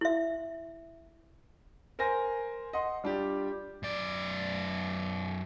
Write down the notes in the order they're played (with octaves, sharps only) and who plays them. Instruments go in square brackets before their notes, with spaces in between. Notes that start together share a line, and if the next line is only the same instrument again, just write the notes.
[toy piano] E4 E5
[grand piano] A#4 C5 G#5 A#6
D#5 F#5 C6
G3 D4 F4 G4
[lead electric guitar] F#2 D5